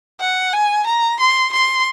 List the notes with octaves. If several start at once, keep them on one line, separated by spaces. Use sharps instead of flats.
F#5
G#5
A#5
C6
C6